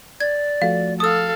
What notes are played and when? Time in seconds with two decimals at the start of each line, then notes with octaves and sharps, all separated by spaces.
0.20 D5 G#6
0.62 F3 A3 F#4 F5
1.00 A4 F5 D#6 E6